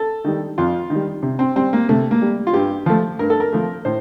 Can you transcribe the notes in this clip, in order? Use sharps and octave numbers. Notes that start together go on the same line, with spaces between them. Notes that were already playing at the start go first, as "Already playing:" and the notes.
Already playing: A4
D#3 G3
F2 F4
D#3
G3
C3
C4
G3 C4
A#3
C3 A3
A#3
G3
F4
G2 G4
F3 A3
G2 A#4
A4
A#4
F3 A3
A2 C5